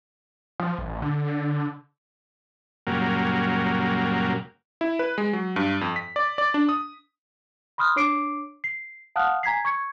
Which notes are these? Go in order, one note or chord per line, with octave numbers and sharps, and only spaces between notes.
F3
A1
D3
F#2 A#2 C#3 F#3 G3 A#3
E4
B4
G#3
F#3
G2
F2
B6
D5
D5
D4
D#6
B5 C6 D#6 F6 F#6
D4 C#5 D6 C7 D7
C7
F5 F#5 A5 D#6 F6 F#6
G#5 A#5 G#6 B6 C7
C#6 G#6 C#7